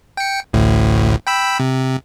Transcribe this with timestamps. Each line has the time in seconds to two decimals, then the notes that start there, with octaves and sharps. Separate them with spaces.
0.17 G5 C#7
0.53 A1 D2 A2
1.27 G5 B5 E6
1.60 C3